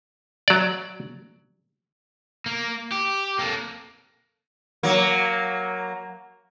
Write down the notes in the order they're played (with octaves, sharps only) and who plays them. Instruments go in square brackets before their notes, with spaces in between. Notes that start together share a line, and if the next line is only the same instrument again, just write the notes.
[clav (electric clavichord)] F#3 D5
[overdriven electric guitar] A#3
G4
A#3 A4
[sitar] F#3 A#3